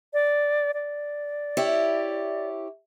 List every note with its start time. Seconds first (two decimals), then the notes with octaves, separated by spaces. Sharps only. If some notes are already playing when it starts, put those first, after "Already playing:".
0.13 D5
0.74 D5
1.57 E4 G4 C#5